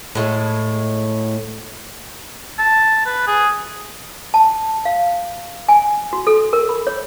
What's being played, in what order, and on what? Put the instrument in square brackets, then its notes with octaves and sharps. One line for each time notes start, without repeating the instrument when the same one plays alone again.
[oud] A2 G#3
[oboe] A5
B4
G#4
[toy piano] A5
F5
G#5
F#4
A4
A#4
B5
C#5